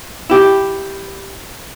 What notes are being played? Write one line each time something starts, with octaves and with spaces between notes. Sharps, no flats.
E4 G4